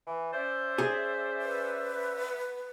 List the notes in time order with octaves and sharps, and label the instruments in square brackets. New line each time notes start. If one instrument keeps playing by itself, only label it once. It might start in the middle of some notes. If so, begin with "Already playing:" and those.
[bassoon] E3
[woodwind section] C#4 D5 E5 [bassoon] C5
[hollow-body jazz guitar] G#4
[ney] B4